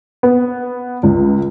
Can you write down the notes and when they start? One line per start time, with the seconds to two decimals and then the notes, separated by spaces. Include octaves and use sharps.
0.23 B3
1.03 C#2